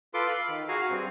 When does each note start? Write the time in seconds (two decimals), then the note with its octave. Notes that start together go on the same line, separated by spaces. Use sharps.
0.14 F4 A4 B4 C6 D6
0.28 F5 B5
0.48 D#3
0.69 F#4 G#4 F5 G#5 A#5
0.90 G2 C4